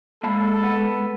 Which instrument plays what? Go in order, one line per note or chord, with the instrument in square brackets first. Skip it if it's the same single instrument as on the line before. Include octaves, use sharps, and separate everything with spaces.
[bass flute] G#3 [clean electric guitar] A#3 A5 B5 [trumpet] A4
[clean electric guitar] B3